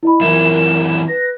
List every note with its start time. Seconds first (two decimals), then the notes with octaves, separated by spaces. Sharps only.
0.03 E4 D#5 B5
0.21 F#2 E3 A#4 E5 E7
0.57 E7
1.08 B4 A#6